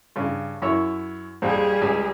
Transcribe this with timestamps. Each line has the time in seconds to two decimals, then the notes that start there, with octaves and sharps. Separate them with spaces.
0.16 G2 C#3
0.62 F#2 E4 C#5
1.42 A#1 F2 G3 C4 G#4
1.82 C#2